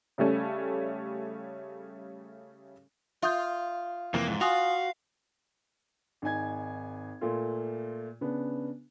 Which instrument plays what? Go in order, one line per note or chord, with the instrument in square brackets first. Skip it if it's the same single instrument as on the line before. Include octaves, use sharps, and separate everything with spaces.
[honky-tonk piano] C#3 G3 A3 C#4
[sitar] F4 [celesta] E5 D#6 G6
[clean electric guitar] F2 C3 E3 [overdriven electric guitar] A#3
[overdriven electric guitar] G#2
[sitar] F4 [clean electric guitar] F#4 [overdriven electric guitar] F5 [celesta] G#5 D#6 F7
[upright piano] G#1 D#4 G#5 G#6
A#2 A3 F4
C#3 B3 D4